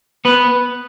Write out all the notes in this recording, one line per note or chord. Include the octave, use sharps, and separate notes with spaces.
B3 B4